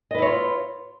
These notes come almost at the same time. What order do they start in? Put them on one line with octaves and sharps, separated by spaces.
D#5 B4 E4 C#5 F4